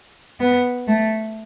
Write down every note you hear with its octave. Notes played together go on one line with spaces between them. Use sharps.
B3
A3